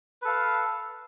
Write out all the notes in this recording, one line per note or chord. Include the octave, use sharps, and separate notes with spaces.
A4 B4 F5